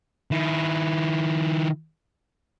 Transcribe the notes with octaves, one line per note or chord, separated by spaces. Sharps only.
D#3 E4